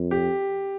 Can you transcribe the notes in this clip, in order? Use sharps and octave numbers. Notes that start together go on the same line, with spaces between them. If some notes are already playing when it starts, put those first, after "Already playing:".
Already playing: F2
G4